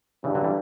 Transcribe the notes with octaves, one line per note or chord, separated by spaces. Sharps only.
G2 C#3 E3
D3 F#3
E3 G3